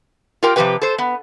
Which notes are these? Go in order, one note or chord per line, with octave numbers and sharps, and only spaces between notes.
F4 G4 A#4 G5
C3 D#3 F3 G4 B4 G5
A4 C5
B3